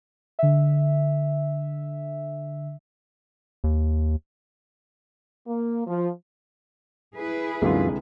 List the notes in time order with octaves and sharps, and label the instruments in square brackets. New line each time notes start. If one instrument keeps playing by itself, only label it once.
[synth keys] D3 E5
[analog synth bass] D#2
[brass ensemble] A#3
F3
[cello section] E4 G#4 B4
[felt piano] C2 D3 G#3 [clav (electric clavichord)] F#2 E3 F4